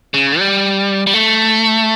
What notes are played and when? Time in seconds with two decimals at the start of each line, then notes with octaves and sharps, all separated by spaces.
0.14 C#3
0.39 G3
1.07 G3
1.14 A3